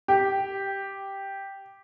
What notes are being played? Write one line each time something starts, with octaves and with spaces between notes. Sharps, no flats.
G4